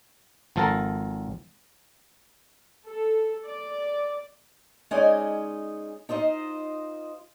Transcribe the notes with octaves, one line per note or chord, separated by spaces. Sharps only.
G#1 F3 A4 A#4 A5 A#5
A4
D5
G#3 C#4 D#4 D5 D#5 G#5
D#4 F4 C5 D#5